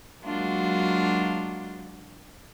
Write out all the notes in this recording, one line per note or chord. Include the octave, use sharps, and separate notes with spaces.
F#3 G#3 A#3 D4 F4 F#4